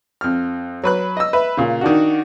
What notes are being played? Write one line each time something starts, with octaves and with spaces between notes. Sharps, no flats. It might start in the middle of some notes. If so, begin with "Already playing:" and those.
F2 F6
F#3 B4 F#6
D#5 E6
B4 E5
A#2 C#3
D#3 D4 F#4